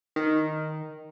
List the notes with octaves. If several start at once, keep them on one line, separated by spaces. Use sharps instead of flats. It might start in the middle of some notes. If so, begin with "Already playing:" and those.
D#3